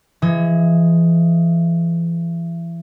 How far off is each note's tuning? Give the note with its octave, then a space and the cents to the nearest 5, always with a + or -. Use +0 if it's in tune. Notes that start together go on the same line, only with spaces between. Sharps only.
E3 +35 G#4 -5 D#5 +45